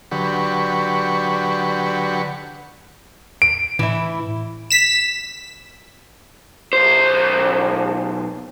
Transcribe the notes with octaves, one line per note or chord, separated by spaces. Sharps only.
D3 F#3 G4 B4 C#6
D7
A2 E3 E4
B6 E7
B1 C5